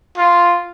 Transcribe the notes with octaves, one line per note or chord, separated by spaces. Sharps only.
F4